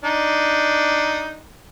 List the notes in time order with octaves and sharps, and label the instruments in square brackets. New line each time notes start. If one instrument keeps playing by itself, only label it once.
[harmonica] D4 D#4